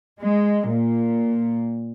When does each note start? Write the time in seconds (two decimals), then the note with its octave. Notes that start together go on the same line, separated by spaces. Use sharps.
0.22 G#3
0.69 A#2